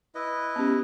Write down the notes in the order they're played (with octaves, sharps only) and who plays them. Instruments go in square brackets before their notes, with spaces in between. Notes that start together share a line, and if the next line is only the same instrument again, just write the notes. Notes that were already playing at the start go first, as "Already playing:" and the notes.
[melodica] E4 B4 D#5
[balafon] B3 C#4 G4